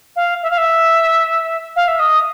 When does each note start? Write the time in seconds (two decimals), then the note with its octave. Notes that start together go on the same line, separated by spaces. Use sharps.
0.16 F5
0.43 E5
0.50 F5
0.58 E5
1.76 F5
1.88 E5
1.99 D#5